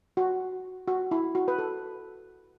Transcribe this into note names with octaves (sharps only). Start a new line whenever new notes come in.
F#4
F#4
E4
F#4
B4
A4